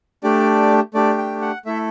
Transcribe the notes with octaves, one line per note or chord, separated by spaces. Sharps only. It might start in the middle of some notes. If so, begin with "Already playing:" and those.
A3 D4 G4 D5
A3 D4 G4 D5
G5
F#5
A3 E4 A4 E5